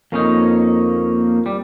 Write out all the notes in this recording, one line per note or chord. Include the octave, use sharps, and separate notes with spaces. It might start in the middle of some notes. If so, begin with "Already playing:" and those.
F2 A#3 C#4 D#4
G3